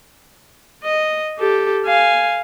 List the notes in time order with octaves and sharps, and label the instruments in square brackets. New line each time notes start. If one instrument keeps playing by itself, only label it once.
[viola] D#5
G4 A4
F5 G#5